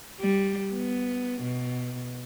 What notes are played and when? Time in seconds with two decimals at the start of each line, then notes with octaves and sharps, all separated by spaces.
0.20 G3
0.73 B3
1.42 B2